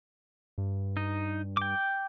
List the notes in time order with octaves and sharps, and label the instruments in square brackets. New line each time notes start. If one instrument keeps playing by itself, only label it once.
[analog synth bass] G2
[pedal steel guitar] D#4
G5 D6